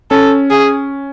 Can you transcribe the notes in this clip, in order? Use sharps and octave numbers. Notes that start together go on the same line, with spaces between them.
C#4 A4
G#4